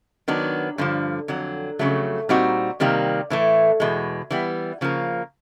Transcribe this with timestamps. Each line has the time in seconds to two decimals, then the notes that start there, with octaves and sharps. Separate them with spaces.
0.28 D#3 F#3 B3 D4
0.78 G2 D3 F3
1.28 F2 D3 F#3
1.79 F2 C#3 F#3 A3
2.29 A#2 G3 C4 D#4 F#4
2.80 C3 D#3 G3 A#3
3.30 A2 E3 A3
3.80 E2 B2 G#3
4.31 E3 G3 B3
4.81 C#3 F3 A#3